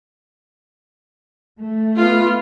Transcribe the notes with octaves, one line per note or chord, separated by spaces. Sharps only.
A3
B3 F4